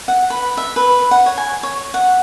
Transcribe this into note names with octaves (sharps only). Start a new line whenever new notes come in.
F#5
B4
E5
B4
F#5
C#5
G#5
C#5
F#5